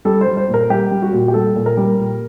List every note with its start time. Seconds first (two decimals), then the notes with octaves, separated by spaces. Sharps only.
0.05 G3 A4
0.21 C5
0.27 G3
0.37 C5
0.48 A#2
0.54 A#4
0.70 G3 G4
0.91 G3
1.03 F#4
1.13 A#2
1.28 G4
1.34 G3 A4
1.56 A#2
1.66 A#4
1.77 G3
1.99 A#2